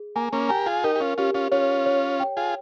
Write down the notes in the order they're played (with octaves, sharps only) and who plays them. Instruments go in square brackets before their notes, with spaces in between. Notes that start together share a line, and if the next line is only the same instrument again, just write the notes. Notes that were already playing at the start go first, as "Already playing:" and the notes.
Already playing: [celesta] G#4
[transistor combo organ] A#3 [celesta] G#5
[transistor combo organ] A#3 C#4
[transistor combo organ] G4 A#4 [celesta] G#5
[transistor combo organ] F4 G#4
[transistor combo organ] D#4 G4 [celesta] A#4
[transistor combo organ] G4
C#4 F4
[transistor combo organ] C#4 F4 [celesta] G4
[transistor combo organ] C#4 F4
[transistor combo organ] C#4 F4 [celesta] C#5
[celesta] C#5
G5
[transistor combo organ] F4 G#4